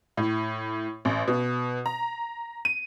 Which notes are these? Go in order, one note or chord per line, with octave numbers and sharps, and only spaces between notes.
A2
A1
B2
A#5
D#7